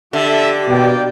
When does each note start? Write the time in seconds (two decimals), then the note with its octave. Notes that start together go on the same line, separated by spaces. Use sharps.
0.13 D3 G4 A4 E5
0.69 B2 A#3 D5 G5